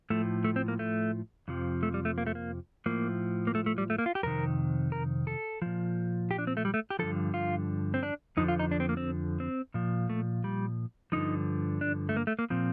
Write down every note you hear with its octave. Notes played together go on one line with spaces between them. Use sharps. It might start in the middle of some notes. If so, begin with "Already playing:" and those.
A2 F3 A3
A3
C4
A#3
A3
F2 C3 F3
A3
G3
A3
A#3
A3
A#3
A2 F3 A#3
A#3
A3
A3
G3
A3
A#3
F4
G4
F2 C3 D#3 A#4
A#4
A4
A#2 F3
G4
D4
C4
A3
G3
A3
G4
G2 D3 F3 A4
F4
C4
D4
F2 D3 F3 D#4
F4
D#4
D4
C4
A#3
C4
C4
A#2 F3
A3
G3
G2 D3 F3 D#4
D4
A3
A#3
A3
A#3
A#2 F3 C4